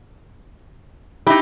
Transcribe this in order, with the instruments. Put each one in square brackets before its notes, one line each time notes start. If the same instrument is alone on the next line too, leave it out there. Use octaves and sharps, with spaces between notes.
[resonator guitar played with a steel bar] D#4 G4 [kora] E4